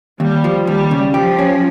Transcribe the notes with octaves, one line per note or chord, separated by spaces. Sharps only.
D#2 G3
F3
D#2 G3
C#3
F3 G4
C#4